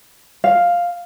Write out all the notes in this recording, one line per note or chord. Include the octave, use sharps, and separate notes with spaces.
F5